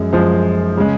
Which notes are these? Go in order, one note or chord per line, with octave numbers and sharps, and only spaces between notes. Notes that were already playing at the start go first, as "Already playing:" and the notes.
Already playing: F#2 F3 G#3
F#2 F3 G#3 C5
C#3 G#3